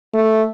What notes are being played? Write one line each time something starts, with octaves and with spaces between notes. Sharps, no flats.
A3